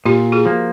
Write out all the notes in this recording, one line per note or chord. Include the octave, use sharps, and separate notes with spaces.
A#2 F4 G4
F#4 G#4
F3 A#3